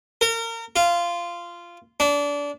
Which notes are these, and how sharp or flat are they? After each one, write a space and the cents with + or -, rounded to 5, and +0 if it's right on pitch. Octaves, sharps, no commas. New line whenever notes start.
A#4 -30
F4 -15
D4 -25